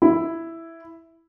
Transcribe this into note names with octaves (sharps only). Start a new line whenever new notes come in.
E4